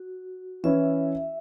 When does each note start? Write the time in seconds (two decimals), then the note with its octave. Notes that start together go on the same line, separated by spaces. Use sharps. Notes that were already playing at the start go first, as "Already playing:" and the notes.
Already playing: F#4
0.64 E3 C#4 E4 E5